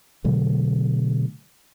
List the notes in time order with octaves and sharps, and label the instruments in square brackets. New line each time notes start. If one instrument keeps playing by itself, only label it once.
[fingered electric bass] B2 D3 F#3 A3